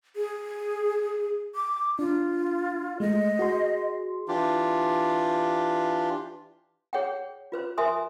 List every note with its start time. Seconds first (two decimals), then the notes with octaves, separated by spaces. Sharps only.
0.16 G#4
1.55 D6
1.99 D4 F4
3.00 G#3 A3 D#5
3.39 F#4 G#4 C6
4.28 E3 D4 F4 G4
6.93 G#4 C#5 F#5 G5
7.52 F4 B4 C5
7.78 A#4 C5 E5 G#5 C6 D#6